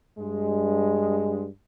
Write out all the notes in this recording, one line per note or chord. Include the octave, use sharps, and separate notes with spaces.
G2 G#3